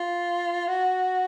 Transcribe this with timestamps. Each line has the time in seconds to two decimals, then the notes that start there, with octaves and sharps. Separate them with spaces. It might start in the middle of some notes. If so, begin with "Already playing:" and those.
Already playing: F4
0.68 F#4